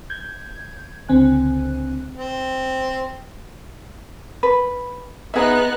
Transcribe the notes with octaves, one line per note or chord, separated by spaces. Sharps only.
G6 G#6
C#2 D3 C4 G#5 F#6
C4
B4
B3 D#4 G#4 E5 F#6